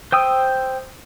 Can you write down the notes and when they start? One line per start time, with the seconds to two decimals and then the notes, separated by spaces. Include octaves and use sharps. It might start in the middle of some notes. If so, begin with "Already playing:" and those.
0.12 C5 G5 D#6 E6